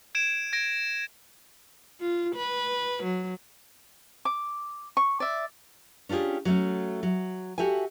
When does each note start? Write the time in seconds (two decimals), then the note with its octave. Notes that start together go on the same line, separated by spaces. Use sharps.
0.15 G#6 D7 E7
0.53 G#6 A#6 D7
2.01 F4
2.36 B4
3.03 F#3
4.25 D6
4.97 C#6
5.20 D5 E5
6.09 C#4 D4 F4 G4 G#4
6.45 F#3 A3 C#4
7.03 F#3
7.58 F#4 G4 A4 E5 G#5